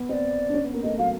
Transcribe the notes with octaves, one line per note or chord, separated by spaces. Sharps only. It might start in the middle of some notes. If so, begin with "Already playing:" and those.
Already playing: B3
C4 D5 D#5
D4
C#4
B3
A#3
A3 D#5
F#3 F5